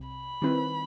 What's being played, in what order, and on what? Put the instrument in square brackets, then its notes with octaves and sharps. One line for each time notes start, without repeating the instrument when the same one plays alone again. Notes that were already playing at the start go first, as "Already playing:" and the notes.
Already playing: [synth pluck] C2 C3
[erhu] B5
[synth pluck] D#3 G3 C4 E4 B4